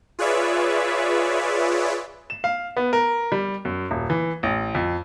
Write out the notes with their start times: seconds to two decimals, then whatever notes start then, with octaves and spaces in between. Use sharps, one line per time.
0.19 F4 G#4 B4 C#5 D5 E5
2.30 E7
2.44 F5
2.77 B3
2.93 A#4
3.32 G3
3.65 F#2
3.91 D#1
4.10 E3
4.43 A1
4.75 F2